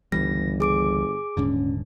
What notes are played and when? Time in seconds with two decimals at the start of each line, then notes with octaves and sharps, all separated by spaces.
0.12 G1 C#2 E3 G3 A#6
0.60 G#4 D6 D7
1.37 D#1 G#2 D3 C#4